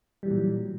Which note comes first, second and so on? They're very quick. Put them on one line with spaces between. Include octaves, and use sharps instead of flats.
G3 E3 F#3 A#2